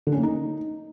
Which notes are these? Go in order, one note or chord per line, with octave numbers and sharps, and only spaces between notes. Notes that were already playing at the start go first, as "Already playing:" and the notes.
D3
C#4
A#3
D#4